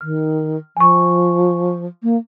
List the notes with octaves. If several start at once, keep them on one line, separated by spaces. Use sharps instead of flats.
D#3 F6
F3 G#5 C#6
A#3